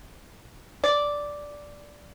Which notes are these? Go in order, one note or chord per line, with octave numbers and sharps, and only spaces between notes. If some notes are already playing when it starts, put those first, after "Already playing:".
D5